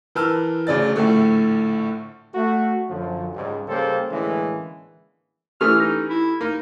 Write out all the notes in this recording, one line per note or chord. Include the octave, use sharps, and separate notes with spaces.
E3 A#4 B4 A5 E6 F6
D2 C#3 D5 A6
A#1 A2 D3 A3
A3 F#4
F#2 D3 F3
C#2 G#2 G3
C#3 G3 A#3 G4 A4 C5
A2 D3 E3 G#3 A#3 C#4
E3 A3 C#4 G4 A4 F6
D#4
E4
A#3 D#4